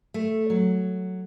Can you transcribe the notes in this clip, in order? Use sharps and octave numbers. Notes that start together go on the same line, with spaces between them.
A3
F#3